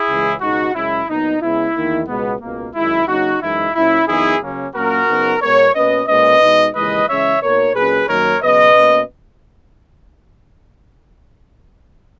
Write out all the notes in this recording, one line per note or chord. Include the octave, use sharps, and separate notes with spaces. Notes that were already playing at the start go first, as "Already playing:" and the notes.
Already playing: E4 G#4
C#2 C#3 E3 G#3
C#2 B2 G#3 D#4 F#4
F#2 C#3 G#3 C#4 E4
A#2 F#3 B3 D#4
C#3 G#3 B3 E4
E2 D#3 A#3 D#4
C#2 B2 G#3 B3
C#2 B2 A#3
F#2 D#3 G#3 E4
C#3 F#3 A#3 D#4 F#4
F#2 E3 G#3 D#4 E4
A#2 F#3 C#4 E4
F#2 E3 B3 D#4 E4 G#4
C#3 F#3 A#3 C#4
A#2 F#3 A#3 C#4 F#4 A#4
C#3 F#3 B3 D#4
B2 G#3 B3 A#4 C#5
B2 A#3 C#4 B4 D#5
A#2 G#3 C#4 B4 D#5
B2 G#3 D#4
D#2 C#3 E3 G#3 B4 D#5
C#3 E3 G#3 C#4 C#5 E5
B2 A#3 D#4 A#4 C#5
A#2 F#3 C#4 G#4 B4
F#2 D#3 F#3 A#3 D#4 A#4 C#5
C#3 F#3 B3 B4 D#5
B2 A#3 C#4